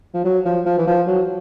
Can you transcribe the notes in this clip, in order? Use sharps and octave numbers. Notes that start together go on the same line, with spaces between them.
F3
F#3
F3
F3
E3
F3
F#3